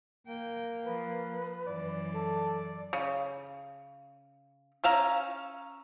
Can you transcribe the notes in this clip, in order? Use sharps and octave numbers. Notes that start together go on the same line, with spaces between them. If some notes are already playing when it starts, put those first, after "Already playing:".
A#3 G5
F3 B4
F#2 E3 D5
A4
C#3
C#4 E5 F5 A#5